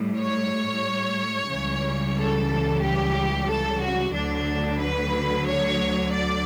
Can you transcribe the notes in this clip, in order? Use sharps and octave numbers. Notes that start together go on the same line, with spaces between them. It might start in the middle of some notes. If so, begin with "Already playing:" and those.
Already playing: A2 G3
C#5
C#2 C#3 E3 G3
A4
G4
A4
F#4
D2 D3 F#3 D4
B4
C#5
D5